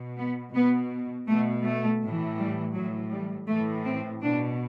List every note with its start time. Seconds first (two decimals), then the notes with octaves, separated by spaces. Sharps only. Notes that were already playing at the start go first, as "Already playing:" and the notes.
Already playing: B2
0.18 B3
0.55 B2 B3
1.27 B2 A3
1.64 A3
2.01 A2 E3
2.38 G3
2.74 A2 E3 F#3
3.11 G3
3.47 A2 E3 A3
3.85 C4
4.21 B2 D4